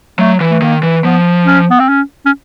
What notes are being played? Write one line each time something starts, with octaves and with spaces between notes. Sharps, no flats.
F#3 A3
E3
A3
D#3 A#3
E3
F3 B3
C#4
B3
C4
C#4
C#4